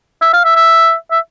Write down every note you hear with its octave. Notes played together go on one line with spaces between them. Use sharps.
E5
F5
E5
E5
E5